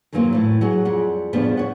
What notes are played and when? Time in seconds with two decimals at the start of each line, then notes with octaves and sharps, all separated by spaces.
0.13 F#2 D#3 E3 F#3 A#3 C4
0.33 A2 E3
0.61 F#3 G#4 F#5
0.85 F2 G3 G#4 F#5
1.33 E2 C#3 F3 G3 B3 D4
1.57 C#5 F#5